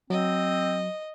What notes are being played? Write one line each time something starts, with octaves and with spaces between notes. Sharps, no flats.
F#3 C4 D#5